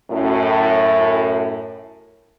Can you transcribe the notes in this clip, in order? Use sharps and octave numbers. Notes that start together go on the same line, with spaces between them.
F#2 A2